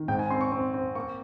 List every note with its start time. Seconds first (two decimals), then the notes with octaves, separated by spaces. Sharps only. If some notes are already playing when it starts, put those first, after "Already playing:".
Already playing: D#3
0.08 G#2 G5
0.19 G#5
0.30 C4 C6
0.41 C#6
0.52 C4
0.74 C4
0.95 A#3 C#6